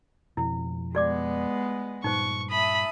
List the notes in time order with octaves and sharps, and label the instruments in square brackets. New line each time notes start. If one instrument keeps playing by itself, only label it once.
[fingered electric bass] F2 B2 F3 [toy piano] E4
[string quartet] G#3 B3 [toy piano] G4 D5 D6
[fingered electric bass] G2 A#2 [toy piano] D#4 C5 [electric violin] C#6
[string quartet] E5 A5 D#6 [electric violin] B5